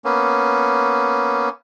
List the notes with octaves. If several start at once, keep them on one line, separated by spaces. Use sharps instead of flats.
A#3 B3 C#4